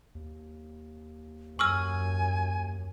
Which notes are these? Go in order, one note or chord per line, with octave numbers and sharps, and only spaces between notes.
D#2
F#2 G#5 C#6 E6 F6